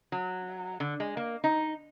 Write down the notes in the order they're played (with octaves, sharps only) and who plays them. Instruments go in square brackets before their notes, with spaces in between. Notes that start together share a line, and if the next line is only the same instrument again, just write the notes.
[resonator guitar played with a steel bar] F#3
D3
G#3
A#3
D#4